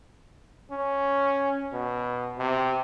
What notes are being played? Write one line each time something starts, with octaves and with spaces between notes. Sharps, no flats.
C#4
B2
C3